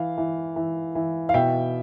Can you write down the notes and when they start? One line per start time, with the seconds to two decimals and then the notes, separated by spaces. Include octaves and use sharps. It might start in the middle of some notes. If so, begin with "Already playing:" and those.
Already playing: E3 F5
0.18 E3
0.56 E3
0.95 E3
1.29 F5
1.34 B2 E5 G5